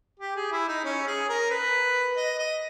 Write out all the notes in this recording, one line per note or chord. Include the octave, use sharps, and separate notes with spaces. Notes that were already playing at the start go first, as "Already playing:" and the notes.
G4
G#4
E4
D#4
C#4
G#4
A#4
B4
D#5
D#5